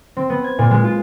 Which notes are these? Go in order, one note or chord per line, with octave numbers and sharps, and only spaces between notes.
C4
B3
G#6
A#2
G#3
F4